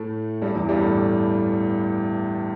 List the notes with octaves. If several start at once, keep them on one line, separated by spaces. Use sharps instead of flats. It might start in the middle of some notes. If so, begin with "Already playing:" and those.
Already playing: A2 A3
G2 G3
E2 E3
G2 G3
A2 A3